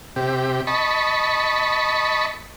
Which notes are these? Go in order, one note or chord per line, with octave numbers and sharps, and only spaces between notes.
C3 G4
D#5 A5 B5 C#6